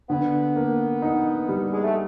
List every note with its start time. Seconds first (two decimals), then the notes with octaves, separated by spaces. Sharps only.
0.09 D3 B3
0.56 A#3
1.02 D#4
1.49 G3
1.72 G#3
1.84 A3